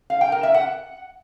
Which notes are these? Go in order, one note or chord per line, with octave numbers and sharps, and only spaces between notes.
F5
G5
A#4
E5
F#5